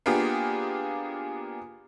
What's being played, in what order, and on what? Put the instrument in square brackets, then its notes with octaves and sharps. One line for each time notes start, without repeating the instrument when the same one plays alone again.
[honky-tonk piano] A#3 B3 D4 F4 G4 G#4